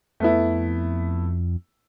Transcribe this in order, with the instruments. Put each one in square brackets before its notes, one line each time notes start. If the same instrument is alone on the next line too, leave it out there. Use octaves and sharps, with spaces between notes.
[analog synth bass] F2 [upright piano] A3 B3 E4